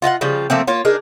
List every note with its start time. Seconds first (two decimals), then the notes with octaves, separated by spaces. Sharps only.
0.02 F4 D#5 F5 F#5
0.21 C#3 F3 G3 F4
0.50 F3 A3 A#3 C4
0.67 A#3 F4 C#5
0.85 D4 D#4 G#4 A#4